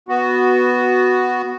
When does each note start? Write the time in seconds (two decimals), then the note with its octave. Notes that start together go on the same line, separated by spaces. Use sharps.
0.09 B3 F#4